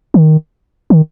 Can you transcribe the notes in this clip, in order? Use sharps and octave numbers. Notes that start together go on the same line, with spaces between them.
D#3
D#3